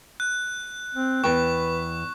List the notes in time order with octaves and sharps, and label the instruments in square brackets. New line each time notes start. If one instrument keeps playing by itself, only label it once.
[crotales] F#6
[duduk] C4
[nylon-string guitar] E2 G5 [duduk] B4 [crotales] C#6